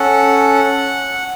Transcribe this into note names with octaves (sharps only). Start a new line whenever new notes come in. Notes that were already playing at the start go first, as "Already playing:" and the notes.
Already playing: C#4 A4 F#5